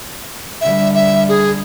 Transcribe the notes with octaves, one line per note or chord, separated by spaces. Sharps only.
D3 G3 E5
E5
G#4